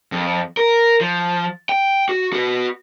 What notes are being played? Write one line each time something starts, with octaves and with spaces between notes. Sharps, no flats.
F2
A#4
F3
G5
F#4
F#4 B4